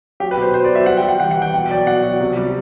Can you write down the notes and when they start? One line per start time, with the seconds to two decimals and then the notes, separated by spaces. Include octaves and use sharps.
0.20 F#3 G4
0.31 B4
0.37 B2 C5
0.53 F#3 C5
0.64 D5
0.69 F#3
0.75 E5
0.86 G3 F#5
0.97 G5
1.03 G3
1.09 F#5
1.20 E3 F#5
1.31 F#5
1.37 E3 G5
1.54 B2
1.70 F#3 D5
1.86 B2 F#5
2.03 F#3
2.21 C3
2.37 G3